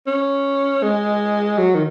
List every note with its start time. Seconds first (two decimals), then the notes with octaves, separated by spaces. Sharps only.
0.07 C#4
0.83 G#3
1.58 F#3
1.75 D#3